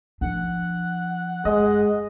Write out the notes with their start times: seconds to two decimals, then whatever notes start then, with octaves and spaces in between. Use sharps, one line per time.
0.21 F3 D4 F#5
1.45 F#2 G#3 D#5